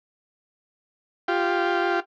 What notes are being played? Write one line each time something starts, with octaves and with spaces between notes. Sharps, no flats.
F4 G4